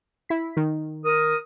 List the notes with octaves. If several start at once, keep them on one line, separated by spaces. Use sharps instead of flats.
E4 B6
D#3
A#4 D#6